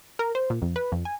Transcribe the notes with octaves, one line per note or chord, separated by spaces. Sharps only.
A#4
C5
A#2
F2
B4
F2
G#5